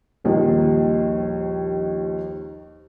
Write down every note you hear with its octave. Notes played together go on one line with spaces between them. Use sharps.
A#1 D#2 D#3 F3 G3